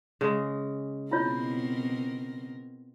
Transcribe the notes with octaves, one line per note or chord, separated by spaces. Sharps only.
C#3 G#3
B2 C4 E4 F4 A#4 C#5